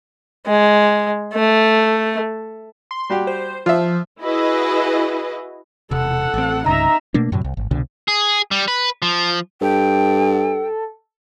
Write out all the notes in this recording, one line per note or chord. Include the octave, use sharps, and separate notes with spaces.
G#3
A3
C6
G3 F#4 G4
C5
F3 F4 E5
E4 F#4 G#4 B4 D#5
E1 C3 A4 F#5
A1 C4
C2 G2 C#3 D#4 E5 A#5
B2 A3 A#3 D4
F#2 A2 C3 F#3
C2
G#1
C2 B2 D3
G#4
G3
B4
F3
G2 A4 G5